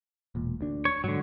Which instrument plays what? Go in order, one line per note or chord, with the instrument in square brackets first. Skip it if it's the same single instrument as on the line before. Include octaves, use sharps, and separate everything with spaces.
[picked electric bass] E1 A#2
D2 D4
[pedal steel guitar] C#5
[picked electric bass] G#2 [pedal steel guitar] D3 F#3